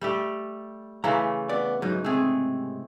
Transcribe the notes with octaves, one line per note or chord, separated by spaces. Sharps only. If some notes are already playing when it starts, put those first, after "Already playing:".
G3 A3 G4
C#3 E3 A3 A#5
B3 D5
G#2 F#3 B3 D#4
G#2 C3 A3 G#4